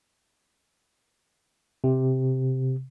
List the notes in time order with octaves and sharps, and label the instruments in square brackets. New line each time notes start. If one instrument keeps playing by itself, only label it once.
[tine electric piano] C3